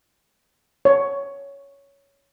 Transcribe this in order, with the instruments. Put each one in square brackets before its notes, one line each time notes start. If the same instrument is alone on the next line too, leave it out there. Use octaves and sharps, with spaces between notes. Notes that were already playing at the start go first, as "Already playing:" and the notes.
[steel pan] C#5